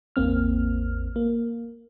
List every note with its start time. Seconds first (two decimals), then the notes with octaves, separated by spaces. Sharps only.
0.16 A1 E2 A#3 C4 F6
1.16 A#3